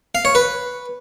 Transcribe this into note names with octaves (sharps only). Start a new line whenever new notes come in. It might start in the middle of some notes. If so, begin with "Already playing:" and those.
F5
C#5
B4